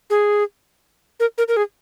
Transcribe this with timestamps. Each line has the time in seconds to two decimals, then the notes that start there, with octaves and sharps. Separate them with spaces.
0.10 G#4
1.20 A#4
1.38 A#4
1.48 A#4
1.57 G#4